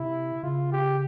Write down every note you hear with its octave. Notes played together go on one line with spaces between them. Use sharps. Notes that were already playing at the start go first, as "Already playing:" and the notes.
Already playing: C3 E4
C#3 F4
G4